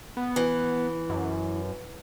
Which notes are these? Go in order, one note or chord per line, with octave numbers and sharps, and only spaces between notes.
B3
E3
F#2